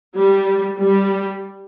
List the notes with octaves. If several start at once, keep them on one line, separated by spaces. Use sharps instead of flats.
G3
G3